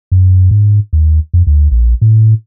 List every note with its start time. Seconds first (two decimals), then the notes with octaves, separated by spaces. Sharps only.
0.12 F#2
0.51 G#2
0.93 D#2
1.34 F2
1.47 D2
1.71 A#1
2.02 A2